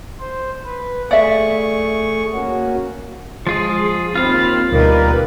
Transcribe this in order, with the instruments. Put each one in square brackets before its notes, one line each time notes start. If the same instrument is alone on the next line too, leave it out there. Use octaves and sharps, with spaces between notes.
[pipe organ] C5
B4
[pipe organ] A3 G#4 C#6 [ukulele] D5 E5
[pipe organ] A#3 C#4 F#4
[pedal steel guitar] F3 F4 G#4 [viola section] G#3
[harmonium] D#2 [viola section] C4 B5 [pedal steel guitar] F4 F5
[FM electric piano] D2 B2 [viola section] G3 B4 [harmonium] A#3 D#4 A#4